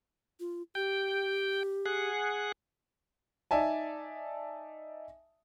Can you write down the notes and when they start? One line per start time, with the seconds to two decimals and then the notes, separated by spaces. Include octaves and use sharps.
0.40 F4
0.75 G4 G5
1.86 G#4 F#5
3.51 D#4 D5 E5 G#5 A5